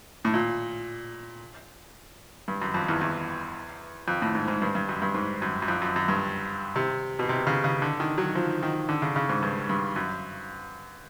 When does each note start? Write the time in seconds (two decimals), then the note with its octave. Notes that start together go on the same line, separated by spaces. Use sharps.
0.25 A2
0.34 A#2
2.48 G2
2.61 F#2
2.74 F2
2.88 E2
3.01 E2
4.08 F2
4.22 A2
4.35 G#2
4.48 G#2
4.62 G2
4.75 G2
4.89 F#2
5.02 G2
5.15 G#2
5.42 F#2
5.62 F#2
5.68 F2
5.82 F#2
5.96 F#2
6.08 G2
6.76 C3
7.19 B2
7.29 C3
7.47 C#3
7.64 C#3
7.82 D3
8.00 D#3
8.18 F#3
8.35 F3
8.63 D#3
8.89 D3
9.02 C#3
9.16 C#3
9.29 G#2
9.42 G2
9.69 G2
9.96 F#2